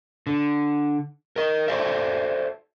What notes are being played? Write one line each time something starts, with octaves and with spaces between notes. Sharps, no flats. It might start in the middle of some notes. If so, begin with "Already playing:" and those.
D3
A#4 D#5
A4 C5 D5 E5